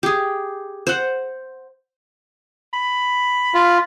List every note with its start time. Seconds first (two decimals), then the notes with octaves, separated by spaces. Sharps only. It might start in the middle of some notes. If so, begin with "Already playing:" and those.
0.03 G4 G#4
0.87 C5 F#5
2.74 B5
3.54 F4